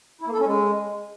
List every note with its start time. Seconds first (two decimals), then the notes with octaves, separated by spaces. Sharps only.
0.21 E4
0.27 A#3
0.33 A4
0.39 C#4
0.45 G#3